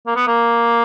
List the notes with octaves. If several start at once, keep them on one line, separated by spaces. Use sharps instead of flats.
A#3
B3
A#3